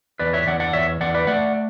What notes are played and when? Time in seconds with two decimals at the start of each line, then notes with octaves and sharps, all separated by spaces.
0.19 E2 B4 D5
0.33 C#5 E5
0.47 E2 D5 F#5
0.60 D5 F#5
0.73 E2 C#5 E5
1.01 E2 D5 F#5
1.14 B4 D5
1.27 A3 D5 F#5